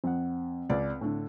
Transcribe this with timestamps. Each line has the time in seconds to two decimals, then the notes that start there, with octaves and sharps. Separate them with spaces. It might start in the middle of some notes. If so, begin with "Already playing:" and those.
0.04 F2 C4 F#5
0.70 C#2 D5
1.01 A2 D3